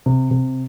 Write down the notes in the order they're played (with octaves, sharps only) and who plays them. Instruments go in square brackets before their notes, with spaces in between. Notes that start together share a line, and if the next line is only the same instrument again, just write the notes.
[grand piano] C3
C3